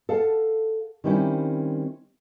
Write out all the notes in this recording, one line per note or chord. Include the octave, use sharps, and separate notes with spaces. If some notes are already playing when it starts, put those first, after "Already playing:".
A4 F5 F#5 A5
D#3 G3 C4 C#4 E4